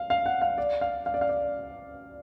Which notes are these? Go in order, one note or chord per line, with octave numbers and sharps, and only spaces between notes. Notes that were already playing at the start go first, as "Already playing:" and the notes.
Already playing: F5
F5
F#5
F5
D5
F5
F5
D5
F5
D5